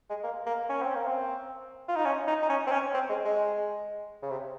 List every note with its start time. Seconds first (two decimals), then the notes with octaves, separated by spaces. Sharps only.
0.10 G#3
0.24 A#3
0.46 A#3
0.69 C#4
0.82 C4
0.95 A#3
1.07 C4
1.88 F4
1.96 D#4
2.05 C#4
2.28 D#4
2.43 D#4
2.50 C#4
2.67 C4
2.72 C#4
2.94 C4
3.09 G#3
3.25 G#3
4.23 C#3
4.30 C3